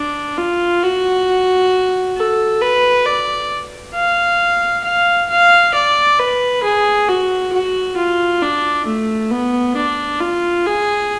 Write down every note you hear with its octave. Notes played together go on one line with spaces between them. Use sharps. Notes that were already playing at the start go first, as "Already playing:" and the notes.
Already playing: D4
F4
F#4
A4
B4
D5
F5
F5
F5
D5
B4
G#4
F#4
F#4
F4
D4
A3
B3
D4
F4
G#4